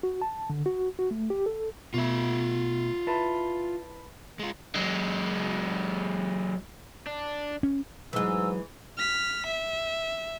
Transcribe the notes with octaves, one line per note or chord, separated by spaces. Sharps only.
F#4
A5
D3
F#4
F#4
A3
G4
A4
B2 A3 F4 E5
E4 B4 A5
G#3 F4
F#3 G#3
D4
C#4
G#2 E3 F#3 G#3 E6
F6 B6
E5